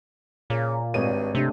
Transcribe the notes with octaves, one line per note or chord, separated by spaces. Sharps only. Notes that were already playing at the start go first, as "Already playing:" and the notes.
A#2 C#3
G#1 G2 C#5 D#5 D#7
C3 A3 D4 G4